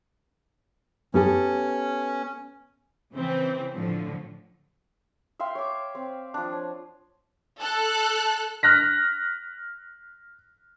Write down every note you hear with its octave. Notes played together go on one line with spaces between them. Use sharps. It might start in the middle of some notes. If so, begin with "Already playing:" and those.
B3 C#4 G4 A4
C#3 E3 C4
A2 D3 F3
E5 F5 G5 C6
C#5 C#6 D6
C4
F3 D4
C#5
A4 F#6
F6 F#6 A#6 B6